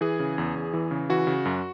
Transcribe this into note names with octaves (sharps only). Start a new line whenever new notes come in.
E3 G#4
C#3
E2
E2
E3
C#3
E3 F#4
C#3
F#2